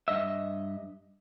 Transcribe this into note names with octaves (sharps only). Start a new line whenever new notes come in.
G2 D#5 E5